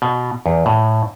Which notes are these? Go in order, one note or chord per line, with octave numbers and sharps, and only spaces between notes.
B2
E2
A2